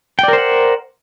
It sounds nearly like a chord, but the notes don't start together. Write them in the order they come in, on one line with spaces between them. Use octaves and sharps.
G5 D5 A#4 C5 F#5